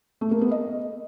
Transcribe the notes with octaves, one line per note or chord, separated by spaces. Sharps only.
A3
A#3
B3
D#5